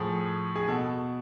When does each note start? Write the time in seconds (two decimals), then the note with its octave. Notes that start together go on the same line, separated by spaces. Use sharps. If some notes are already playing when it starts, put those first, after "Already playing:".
Already playing: A2 F3 G#4
0.56 G#4
0.68 B2 A4